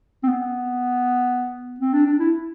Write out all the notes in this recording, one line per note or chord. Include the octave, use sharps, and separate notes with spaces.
C4
B3
C4
D4
D4
E4